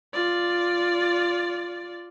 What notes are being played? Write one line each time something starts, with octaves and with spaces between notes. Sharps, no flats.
F4 D5